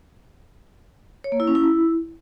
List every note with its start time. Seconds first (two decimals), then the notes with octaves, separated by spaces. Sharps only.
1.24 C#5
1.32 A#3
1.40 E4
1.47 C#4
1.55 E4